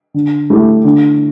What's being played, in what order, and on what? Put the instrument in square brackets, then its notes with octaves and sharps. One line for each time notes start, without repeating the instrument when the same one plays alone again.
[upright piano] D3
A3 E4 G4
D3